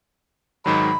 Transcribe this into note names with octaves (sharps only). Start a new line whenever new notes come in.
G#2 D#3 F#3 B5